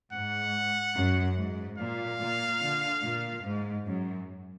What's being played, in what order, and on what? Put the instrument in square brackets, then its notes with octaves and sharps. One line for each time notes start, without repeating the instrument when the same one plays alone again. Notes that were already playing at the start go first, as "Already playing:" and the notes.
[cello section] G#2 [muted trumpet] F#5
[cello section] F#2
G#2
[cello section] A#2 [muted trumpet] F5
[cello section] A#2
D3
A#2
G#2
F#2